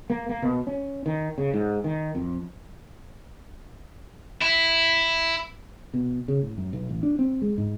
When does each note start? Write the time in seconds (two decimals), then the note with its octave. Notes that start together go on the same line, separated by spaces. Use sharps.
0.10 A#3
0.29 A#3
0.42 B2
0.67 C#4
1.06 D#3
1.38 C#3
1.54 G#2
1.84 D#3
2.15 F2
4.41 E4
5.94 B2
6.28 C#3
6.42 A2
6.58 F#2
6.73 B1
6.89 A1
7.03 D4
7.19 C4
7.42 G#3
7.58 G#2